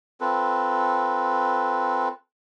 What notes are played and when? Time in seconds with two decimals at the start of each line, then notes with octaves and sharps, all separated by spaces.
0.21 C4 F4 A4 B4